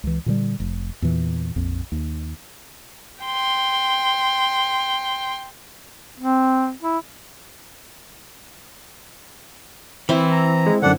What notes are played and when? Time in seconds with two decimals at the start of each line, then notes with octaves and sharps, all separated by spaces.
0.03 C#2 E3
0.26 A#2 D3 E3 G3
0.60 F1
1.02 E2 A#2 E3
1.56 A#1 F2
1.92 D#2
3.24 G5 C6
6.20 C4
6.82 E4
10.09 E3 C4 E4
10.31 A#5
10.66 G#3
10.82 F#2 D3 D4 F#5